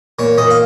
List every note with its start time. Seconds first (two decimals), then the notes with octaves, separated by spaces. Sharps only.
0.19 A#2 C#5
0.37 A#2 D#5
0.50 F5